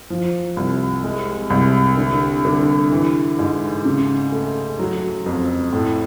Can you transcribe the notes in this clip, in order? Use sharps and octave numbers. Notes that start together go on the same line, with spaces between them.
F3
C2
G#3
C2
D3
D3
E3
G#2
C#3
A3
F#3
F2
A2